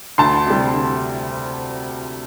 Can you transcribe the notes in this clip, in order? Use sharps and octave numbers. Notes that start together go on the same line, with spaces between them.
D2 A5 C6
C3 G3
D2